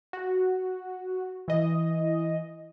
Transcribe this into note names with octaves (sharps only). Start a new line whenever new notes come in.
F#4
E3 D#5